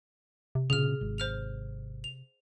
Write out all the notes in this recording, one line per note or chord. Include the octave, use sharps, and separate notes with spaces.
C3
A#2 C#3 G#4 F6
G#1
C5 F6 F7
F7